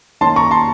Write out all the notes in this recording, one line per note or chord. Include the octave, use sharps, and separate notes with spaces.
D#3 A#3 C#4 A5 C6
A#5 C#6
A5 C6